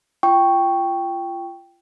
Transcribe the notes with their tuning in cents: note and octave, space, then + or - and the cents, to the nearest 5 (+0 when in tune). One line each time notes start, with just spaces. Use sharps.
F4 -25 G5 +0 C#6 +0